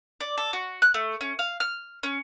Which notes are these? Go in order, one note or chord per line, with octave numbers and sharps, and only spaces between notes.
D5
A4
F#4
F#6
A3
C#4
F5
F6
C#4